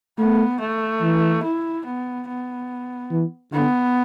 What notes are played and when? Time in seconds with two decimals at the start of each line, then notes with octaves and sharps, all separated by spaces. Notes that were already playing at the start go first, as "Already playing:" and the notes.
0.18 A3 B3
0.60 A3
1.02 E3
1.43 E4
1.85 B3
2.28 B3
3.11 E3
3.52 D3 B3